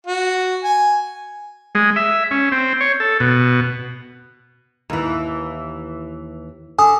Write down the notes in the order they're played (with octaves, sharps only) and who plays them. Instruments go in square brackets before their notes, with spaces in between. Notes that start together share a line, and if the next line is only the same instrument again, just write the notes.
[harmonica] F#4
G#5
[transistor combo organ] G#3
E5
C#4
C4
C#5
A4
B2
[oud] D#2 E3
[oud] D3 [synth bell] G#5 D#6